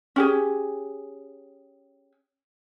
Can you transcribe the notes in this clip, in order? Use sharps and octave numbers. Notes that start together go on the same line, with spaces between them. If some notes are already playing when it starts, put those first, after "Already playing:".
C#4 G4 G#4